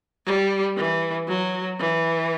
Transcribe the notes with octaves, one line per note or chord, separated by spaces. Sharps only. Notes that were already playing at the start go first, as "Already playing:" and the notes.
G3
E3
F#3
E3